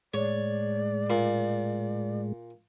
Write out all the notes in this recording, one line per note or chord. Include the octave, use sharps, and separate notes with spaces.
A2 G#3 C#5 D5
A#2